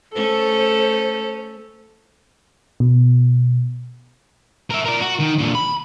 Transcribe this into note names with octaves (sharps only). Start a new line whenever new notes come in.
A3 C#4 A4 C5
B2
A#4 E5
A#4 D5
F#4
D#3
A#2 D3
B5